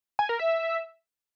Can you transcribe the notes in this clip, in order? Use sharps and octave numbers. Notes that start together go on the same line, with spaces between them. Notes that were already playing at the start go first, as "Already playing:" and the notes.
G#5
A#4
E5